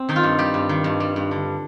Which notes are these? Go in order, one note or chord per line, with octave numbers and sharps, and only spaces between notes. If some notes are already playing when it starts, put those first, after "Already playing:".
Already playing: C4
D#3 D#4
F4
G2
G3 G4
G2
D#3
G2
G3
G2
D3